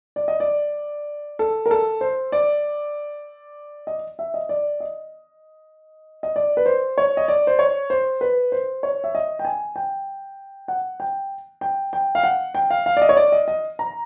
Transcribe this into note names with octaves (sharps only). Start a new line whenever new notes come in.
D5
D#5
D5
A4
A#4
A4
C5
D5
D#5
E5
D#5
D5
D#5
D#5
D5
B4
C5
C#5
D#5
D5
C5
C#5
C5
B4
C5
C#5
E5
D#5
G5
G#5
G5
F#5
G5
G5
G5
F5
F#5
G5
F5
F5
D5
D#5
C#5
D5
D#5
D#5
A#5